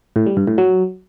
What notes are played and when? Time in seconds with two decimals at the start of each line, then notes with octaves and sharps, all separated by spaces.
0.16 A2
0.26 G3
0.37 G2
0.47 A2
0.58 F#3